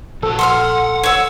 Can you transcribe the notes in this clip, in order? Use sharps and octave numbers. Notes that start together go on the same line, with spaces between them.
A#1 F3 F#4 A4
F#5 C6 E6 F6
C#5 E6